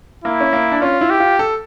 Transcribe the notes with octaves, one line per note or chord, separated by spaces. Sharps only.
A#3 E4
C#4
A#3
D4
C#4 F4
E4
G4
F4
A4